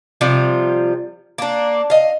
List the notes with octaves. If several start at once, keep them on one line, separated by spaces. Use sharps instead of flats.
C3 F3 G3 F4
A#3 D4
D#5 F5